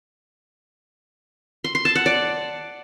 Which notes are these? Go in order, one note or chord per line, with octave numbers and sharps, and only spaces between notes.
C6
C6
A5
F#5
D5